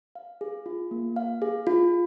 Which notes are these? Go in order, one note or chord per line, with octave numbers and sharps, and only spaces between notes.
F5
G#4
F4
A#3
F5
G#4
F4